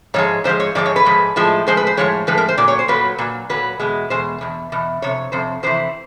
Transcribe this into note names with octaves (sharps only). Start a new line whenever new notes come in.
G#2 F3 G#3 C#5
G#2 F3 G#3 C5
C#5
G#2 F3 G#3 D5
C#5
B4
G#2 F3 G#3
A2 F3 G#3
A2 F3 G#3 C5
B4
C5
A2 F3 G#3 C#5
A2 F3 G#3 B4
A#4
C5
A#2 F#3 D5
C#5
C5
A#2 F#3 B4
A#2 F#3
A#2 F#3 B4
E2 B2 G#3
E2 B2 G#3 C5
E2 B2
E2 B2
F2 C3 C#5
F2 C3 C5
F2 C3 E3 C5